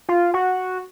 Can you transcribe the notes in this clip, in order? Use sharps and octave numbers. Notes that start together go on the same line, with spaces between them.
F4
F#4